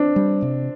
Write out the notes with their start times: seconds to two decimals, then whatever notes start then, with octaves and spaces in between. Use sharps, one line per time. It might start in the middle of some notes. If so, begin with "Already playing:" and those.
Already playing: C4 D4
0.16 G3
0.42 C3